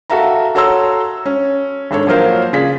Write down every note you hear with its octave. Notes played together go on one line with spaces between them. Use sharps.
F#4 A4 E5 F5 A#5
F#4 A4 C#5 A#5 C6 E6
C#4
G#1 D4 A4 C#5
F3 F#3 A#3 A#4 C5 F5
C#3 F4 G#4 D5 B6